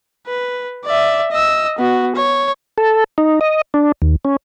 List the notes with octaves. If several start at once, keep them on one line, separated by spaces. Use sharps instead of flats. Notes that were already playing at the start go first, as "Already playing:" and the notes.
B4
D5 E5
D#5 E6
B3 F#4
C#5
A4
D#4
D#5
D4
D#2
C#4